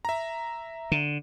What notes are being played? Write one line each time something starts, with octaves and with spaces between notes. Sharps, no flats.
E5 A#5
D3